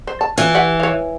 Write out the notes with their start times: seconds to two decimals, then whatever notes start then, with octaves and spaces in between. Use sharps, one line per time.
0.07 C5
0.21 A5
0.38 E3 F4
0.55 G4 E5 F#5
0.80 C#5 F5